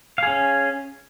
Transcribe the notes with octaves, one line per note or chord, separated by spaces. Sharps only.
C#4 G#4 F5